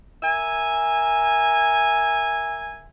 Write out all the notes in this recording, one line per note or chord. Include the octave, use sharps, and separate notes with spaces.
A#4 E5 G#5